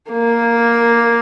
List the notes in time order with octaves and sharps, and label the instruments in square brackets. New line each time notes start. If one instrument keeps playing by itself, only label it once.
[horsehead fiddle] A#3